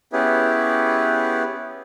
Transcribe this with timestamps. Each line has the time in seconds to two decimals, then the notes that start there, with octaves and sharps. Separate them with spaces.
0.13 B3 C#4 E4 G4 G#4 B4